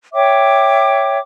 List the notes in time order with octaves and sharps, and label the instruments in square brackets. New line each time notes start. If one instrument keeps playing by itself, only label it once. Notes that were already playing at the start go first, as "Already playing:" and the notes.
[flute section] C#5 E5 G5 D6